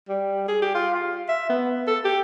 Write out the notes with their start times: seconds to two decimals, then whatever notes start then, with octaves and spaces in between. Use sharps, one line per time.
0.09 G3
0.48 G#4
0.62 G4
0.75 F4
0.94 F4
1.29 E5
1.50 B3
1.87 A4
2.04 G4